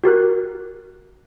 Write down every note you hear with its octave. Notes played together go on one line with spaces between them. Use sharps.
F#4 G4 A#4 F#6